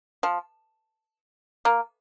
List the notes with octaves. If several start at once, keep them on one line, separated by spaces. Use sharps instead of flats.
F3
A#3